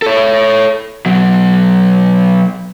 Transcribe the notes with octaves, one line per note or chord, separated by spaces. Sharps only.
A4 C#5
B2 F#3